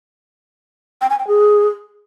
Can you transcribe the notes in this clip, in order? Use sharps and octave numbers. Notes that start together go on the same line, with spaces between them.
G5
G#5
G5
G#4